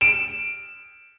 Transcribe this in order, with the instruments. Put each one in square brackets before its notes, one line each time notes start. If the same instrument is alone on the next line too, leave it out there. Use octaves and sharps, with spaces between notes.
[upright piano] D7 E7